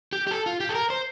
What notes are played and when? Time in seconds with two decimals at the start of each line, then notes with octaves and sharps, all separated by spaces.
0.13 G4
0.27 G4
0.31 A4
0.46 F4
0.60 G4
0.69 A4
0.75 A#4
0.90 C5